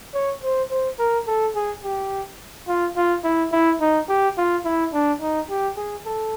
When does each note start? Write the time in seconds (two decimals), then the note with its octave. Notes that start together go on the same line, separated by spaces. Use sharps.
0.14 C#5
0.43 C5
0.71 C5
0.99 A#4
1.27 A4
1.55 G#4
1.84 G4
2.68 F4
2.96 F4
3.24 E4
3.52 E4
3.81 D#4
4.09 G4
4.37 F4
4.65 E4
4.93 D4
5.21 D#4
5.50 G4
5.77 G#4
6.06 A4